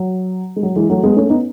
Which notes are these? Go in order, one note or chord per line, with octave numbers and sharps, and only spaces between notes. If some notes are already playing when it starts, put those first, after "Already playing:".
Already playing: F#3
G#3
F#3
E3 G#3
F#3 A3
G#3 B3
A3 C#4
B3 D#4